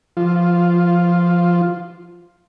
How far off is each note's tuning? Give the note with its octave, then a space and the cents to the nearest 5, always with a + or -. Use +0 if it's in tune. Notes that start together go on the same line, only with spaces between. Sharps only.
F3 -5 F4 +0